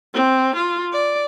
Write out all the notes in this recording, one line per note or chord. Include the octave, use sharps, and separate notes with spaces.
C4
F4
D5